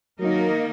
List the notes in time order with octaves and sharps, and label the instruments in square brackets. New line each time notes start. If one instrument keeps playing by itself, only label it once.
[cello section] D#3 A#3 D#4 A#4 [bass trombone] F#3